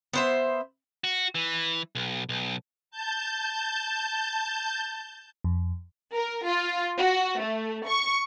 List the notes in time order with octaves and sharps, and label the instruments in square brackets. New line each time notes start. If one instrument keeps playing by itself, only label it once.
[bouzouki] B3 C5 E5
[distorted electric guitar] F#4
E3
B1
B1
[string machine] A5 G6
[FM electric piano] F2
[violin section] A#4
F4
F#4
A3
C#6